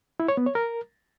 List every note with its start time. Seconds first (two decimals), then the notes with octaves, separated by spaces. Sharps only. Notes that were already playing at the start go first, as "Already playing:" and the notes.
0.20 E4
0.28 C#5
0.37 B3
0.46 C#5
0.55 A#4